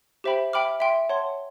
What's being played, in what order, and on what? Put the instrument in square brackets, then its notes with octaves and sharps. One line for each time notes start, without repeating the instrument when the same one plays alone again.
[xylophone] G4 C5 E5 G5 B5
E5 G5 B5 D6 F6
E5 G5 C6
C#5 F#5 A5 C6